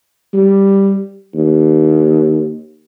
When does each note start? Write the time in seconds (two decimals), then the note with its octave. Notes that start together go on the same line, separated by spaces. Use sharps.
0.34 G3
1.34 D#2